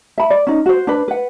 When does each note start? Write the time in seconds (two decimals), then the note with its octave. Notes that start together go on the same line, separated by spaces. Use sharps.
0.18 E5 B5
0.30 D5
0.47 C#4 D#4
0.66 F#4 C5
0.87 D4 B4
1.08 B4 F#5